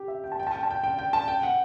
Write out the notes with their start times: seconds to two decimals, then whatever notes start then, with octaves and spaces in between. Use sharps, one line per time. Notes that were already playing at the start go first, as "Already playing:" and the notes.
Already playing: G4
0.08 E5
0.24 G5
0.32 A5
0.40 G5
0.47 A5
0.55 G5
0.63 A5
0.70 G5
0.84 G5
0.99 G5
1.13 A5
1.28 G5
1.43 F#5